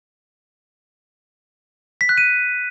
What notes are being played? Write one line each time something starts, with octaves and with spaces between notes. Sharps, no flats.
B6
F#6
D#7